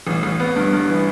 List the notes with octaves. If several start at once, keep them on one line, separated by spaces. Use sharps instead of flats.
A1
A1
B3
G2
G2
E3